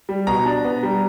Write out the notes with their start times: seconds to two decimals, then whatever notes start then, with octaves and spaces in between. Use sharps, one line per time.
0.09 G3
0.27 B2 A#5
0.46 D4
0.64 B3
0.83 G3